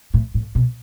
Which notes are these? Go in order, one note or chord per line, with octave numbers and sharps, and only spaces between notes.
A2
A2
B2